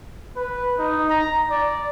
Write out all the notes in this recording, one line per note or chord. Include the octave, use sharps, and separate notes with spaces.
B4
D#4
A#5
D5